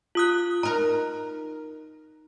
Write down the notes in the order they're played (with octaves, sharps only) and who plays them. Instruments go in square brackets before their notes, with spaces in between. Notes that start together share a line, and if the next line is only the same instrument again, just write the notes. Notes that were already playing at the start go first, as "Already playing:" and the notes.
[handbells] F4 D#6 F#6
[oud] D#4 A#4 [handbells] A#5